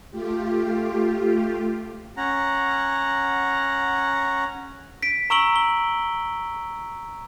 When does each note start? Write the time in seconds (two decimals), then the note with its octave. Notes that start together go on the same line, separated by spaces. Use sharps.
0.11 A3 F4 G4
2.17 C#4 F#5 A#5
5.03 B6 D7
5.30 A#5 C#6 E6 D7 F#7 G7
5.56 G7